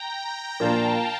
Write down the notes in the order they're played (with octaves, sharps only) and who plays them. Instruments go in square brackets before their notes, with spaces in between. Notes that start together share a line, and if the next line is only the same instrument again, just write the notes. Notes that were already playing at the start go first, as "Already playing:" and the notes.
Already playing: [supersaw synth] G5 A#5
[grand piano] A#2 F3 A#3 D4 [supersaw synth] F5 A5